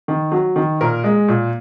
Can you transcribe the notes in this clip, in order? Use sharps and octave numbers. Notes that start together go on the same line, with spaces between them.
D#3
F#3
D#3
A#2 A#4
G#3
A#2